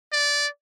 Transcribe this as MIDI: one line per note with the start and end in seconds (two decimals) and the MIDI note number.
0.12 0.47 74